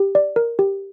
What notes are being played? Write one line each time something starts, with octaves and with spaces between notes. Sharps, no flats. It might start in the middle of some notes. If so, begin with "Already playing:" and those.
Already playing: G4
D5
A#4
G4